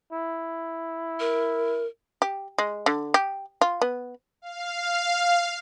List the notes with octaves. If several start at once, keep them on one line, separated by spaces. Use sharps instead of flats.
E4
A#4
G4
G#3
D3
G4
F4
B3
F5